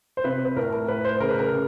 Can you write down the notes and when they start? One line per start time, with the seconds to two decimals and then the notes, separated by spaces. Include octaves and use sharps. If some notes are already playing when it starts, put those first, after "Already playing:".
0.17 C5
0.24 C3 B4
0.45 B4
0.56 A2 A#4
0.72 A#4
0.88 A2 B4
1.05 C5
1.20 C#3 A#4
1.30 B4
1.39 A#4
1.52 C#3